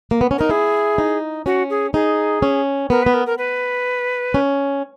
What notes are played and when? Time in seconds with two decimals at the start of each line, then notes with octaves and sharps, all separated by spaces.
0.11 A#3
0.21 B3
0.31 C#4
0.38 D#4 A#4
0.49 E4 G#4
0.98 D#4
1.46 C#4 F#4
1.70 G#4
1.93 D#4 G#4
2.42 C#4
2.90 B3 A#4
3.02 B4
3.06 B3
3.14 A#4
3.26 A#4
3.38 B4
4.34 C#4